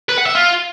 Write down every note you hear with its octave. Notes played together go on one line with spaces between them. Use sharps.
B4
F#5
E5
F4